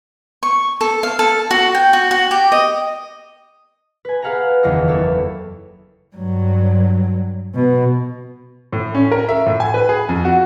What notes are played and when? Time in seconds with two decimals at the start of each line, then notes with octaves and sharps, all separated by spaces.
0.43 C#6
0.81 A4
1.03 F5
1.19 A4
1.51 F#4
1.75 G5
1.93 F#4
2.11 F#4
2.31 G4
2.52 D#5
4.05 B4 G#5
4.22 G#4 B4 F5 F#5 G#5 A#5
4.63 F#1 E2 D#3 F4 D#5
4.88 E3 A#3 B3 A4 C#5
6.16 G2 F#3
7.55 B2
8.73 A2
8.95 C#4
9.11 A#4
9.29 E5
9.46 A2
9.60 G#5
9.74 B4
9.89 G#4
10.09 F2
10.25 F#4